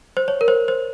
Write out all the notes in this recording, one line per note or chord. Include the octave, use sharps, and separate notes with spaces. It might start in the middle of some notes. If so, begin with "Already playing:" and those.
C5
C#5
A#4
C5
C5